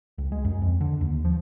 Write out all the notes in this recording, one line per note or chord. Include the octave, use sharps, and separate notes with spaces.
C#2
G#3
F#2
F2
D3
D#2
F3